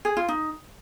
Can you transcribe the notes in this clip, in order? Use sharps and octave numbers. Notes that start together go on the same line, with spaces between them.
G#4
F4
D#4